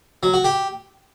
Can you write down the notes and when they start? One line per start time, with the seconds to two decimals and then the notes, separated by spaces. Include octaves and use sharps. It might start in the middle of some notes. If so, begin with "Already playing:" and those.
0.23 F#3
0.34 F#4
0.44 G4